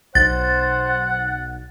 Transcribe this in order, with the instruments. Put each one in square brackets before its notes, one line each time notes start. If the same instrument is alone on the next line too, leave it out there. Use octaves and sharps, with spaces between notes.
[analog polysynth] B1 [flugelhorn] C5 [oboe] F#5 [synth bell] A6